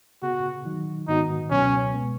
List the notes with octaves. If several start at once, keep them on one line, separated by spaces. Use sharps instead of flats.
C#3 B3 F#4 G#4
D#3 F#3 D#4
G#2 D#3 B3 D#4 F#4
C#2 B2 F#3 B3 C#4
B2 G#3 B3